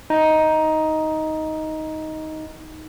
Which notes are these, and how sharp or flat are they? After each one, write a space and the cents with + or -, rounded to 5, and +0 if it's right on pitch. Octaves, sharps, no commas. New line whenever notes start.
D#4 +10